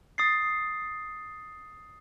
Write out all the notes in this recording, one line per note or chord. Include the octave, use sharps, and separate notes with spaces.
D#6 A6 C7